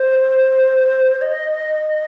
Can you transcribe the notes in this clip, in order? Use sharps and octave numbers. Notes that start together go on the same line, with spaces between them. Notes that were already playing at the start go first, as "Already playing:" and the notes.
Already playing: C5
D#5